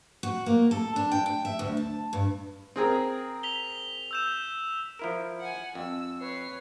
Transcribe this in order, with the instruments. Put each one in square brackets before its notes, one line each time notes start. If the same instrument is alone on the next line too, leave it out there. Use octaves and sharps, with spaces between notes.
[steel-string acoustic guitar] F#4
A#3
A4
D4
G5
G5
E5
D2
A5
G2
[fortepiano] C4 G#4 A#4
[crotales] B6 F7 G7
E6 G6 E7
[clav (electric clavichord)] F3 E4 A#4
[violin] F#5 G#5
[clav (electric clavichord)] F2 [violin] E6
[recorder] B4 [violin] C#5 C7